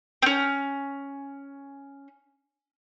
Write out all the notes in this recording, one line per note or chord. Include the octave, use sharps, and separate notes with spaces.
C4 C#4